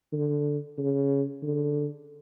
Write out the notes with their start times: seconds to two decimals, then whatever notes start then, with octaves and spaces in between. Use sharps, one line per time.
0.13 D3
0.78 C#3
1.43 D3